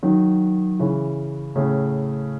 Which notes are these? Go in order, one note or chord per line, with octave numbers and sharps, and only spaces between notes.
D#3 F#3
C#3 E3
A2 C#3